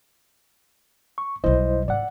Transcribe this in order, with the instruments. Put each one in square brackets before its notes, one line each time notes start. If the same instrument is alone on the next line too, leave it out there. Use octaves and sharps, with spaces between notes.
[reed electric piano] C#6
[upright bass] B1 G3 [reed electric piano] E4 C5 D#5
[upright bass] G#2 [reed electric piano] D5 F#5